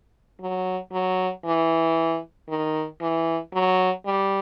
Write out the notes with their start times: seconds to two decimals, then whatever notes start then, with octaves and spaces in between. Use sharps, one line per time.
0.41 F#3
0.93 F#3
1.45 E3
2.49 D#3
3.01 E3
3.54 F#3
4.06 G3